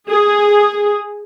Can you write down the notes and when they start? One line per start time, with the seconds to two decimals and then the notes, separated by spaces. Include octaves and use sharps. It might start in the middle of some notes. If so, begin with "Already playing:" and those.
0.10 G#4